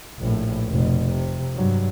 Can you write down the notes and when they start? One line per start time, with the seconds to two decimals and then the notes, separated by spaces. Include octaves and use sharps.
0.19 A#1 A2
0.69 F1 B2
1.12 C3
1.56 G2 F#3